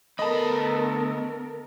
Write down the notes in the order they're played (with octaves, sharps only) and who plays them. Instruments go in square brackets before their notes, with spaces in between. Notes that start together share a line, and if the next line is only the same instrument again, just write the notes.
[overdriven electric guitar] D2 B5 [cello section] B3 A#4 [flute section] A4 [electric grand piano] D#5 A5